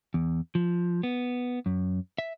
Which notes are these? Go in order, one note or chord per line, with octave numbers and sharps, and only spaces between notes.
E2
F3
B3
F#2
E5